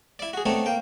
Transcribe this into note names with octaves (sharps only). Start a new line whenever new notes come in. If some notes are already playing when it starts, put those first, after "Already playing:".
E4 D5
F#4 G#4
A3 B3 C4 D#4 C#5 D5
A#3 G5